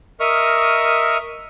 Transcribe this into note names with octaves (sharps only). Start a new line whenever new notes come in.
A#4 D#5 E5 C#6 D#6 F6